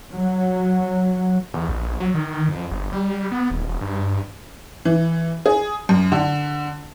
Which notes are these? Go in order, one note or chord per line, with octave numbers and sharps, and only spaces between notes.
F#3
E2
A#1
F#3
D#3
F2
G1
G3
B3
D#1
E1
G2
E3
G#4
F#2
D3